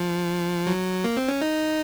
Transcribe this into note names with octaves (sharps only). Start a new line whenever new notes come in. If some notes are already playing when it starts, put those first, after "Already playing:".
Already playing: F3
F#3
A#3
C4
C#4
D#4